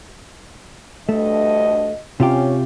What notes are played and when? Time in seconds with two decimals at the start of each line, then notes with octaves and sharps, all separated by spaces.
1.09 D2 G2 A3 D#5
2.20 C3 C#4 F4 G4